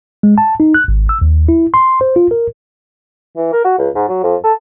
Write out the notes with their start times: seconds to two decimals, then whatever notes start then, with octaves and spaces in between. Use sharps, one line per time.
0.23 G#3
0.38 A5
0.60 D#4
0.74 F#6
0.88 G#1
1.09 E6
1.22 D#2
1.49 E4
1.74 C6
2.01 C5
2.16 F4
2.31 A#4
3.36 E3
3.53 A#4
3.64 F#4
3.78 C#2
3.95 G#2
4.08 F#3
4.23 F2
4.44 A4